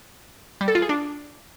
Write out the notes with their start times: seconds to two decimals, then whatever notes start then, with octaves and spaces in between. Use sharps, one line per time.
0.61 G3
0.68 A4
0.75 F4
0.82 G#4
0.89 D4